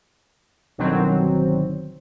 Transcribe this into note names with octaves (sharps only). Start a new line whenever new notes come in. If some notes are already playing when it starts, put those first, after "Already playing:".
G1 B2 D#3 F#3 C4